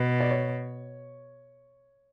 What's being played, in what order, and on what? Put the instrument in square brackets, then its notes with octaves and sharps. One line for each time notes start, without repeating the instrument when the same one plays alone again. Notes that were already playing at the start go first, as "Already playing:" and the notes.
Already playing: [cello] B2 [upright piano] B4
[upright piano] D5
C#5